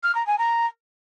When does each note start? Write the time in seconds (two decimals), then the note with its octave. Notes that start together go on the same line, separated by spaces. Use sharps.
0.03 F6
0.14 A#5
0.26 G#5
0.38 A#5